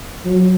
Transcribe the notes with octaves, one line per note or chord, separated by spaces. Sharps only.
F#3